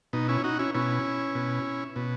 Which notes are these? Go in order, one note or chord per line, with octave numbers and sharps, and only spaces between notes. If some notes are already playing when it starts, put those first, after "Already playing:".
B2 D#4
C#4 E4
D#4 F#4
C#4 E4
B2 C#4 E4
B2
B2